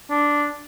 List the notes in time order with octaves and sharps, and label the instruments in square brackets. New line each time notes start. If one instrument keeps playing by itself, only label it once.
[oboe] D4